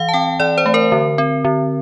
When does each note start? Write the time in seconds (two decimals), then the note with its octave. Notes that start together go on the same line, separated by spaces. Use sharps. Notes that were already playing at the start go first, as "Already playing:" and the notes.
Already playing: E3 F5
0.09 A5
0.13 C4 G5
0.40 E3 D5
0.58 C5
0.66 A3
0.74 A#4
0.92 D3
1.18 C4
1.44 D3